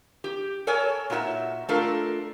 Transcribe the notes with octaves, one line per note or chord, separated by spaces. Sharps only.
G4
A4 A#4 C#5 G#5 A5
A#2 D#4 F#4 A4 E5
A3 D4 F4 A4 A#4